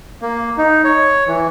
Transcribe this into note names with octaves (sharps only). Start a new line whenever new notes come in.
A#3
D#4
C#5
E3